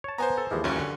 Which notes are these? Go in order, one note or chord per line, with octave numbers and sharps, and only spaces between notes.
C#5 A5
B3 C5 G#5 A#5
A4
D#2 E3 F3 G#3
C#2 F#2 C#4
D3